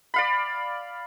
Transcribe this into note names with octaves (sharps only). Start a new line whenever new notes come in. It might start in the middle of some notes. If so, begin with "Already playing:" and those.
D5 F5 B5